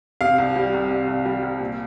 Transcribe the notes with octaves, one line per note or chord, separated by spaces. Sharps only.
C3 F5
C2
G3
C2
C3
C2
G3
C2
A#2